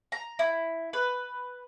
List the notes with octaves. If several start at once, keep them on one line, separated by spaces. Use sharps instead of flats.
A#5
E4
B4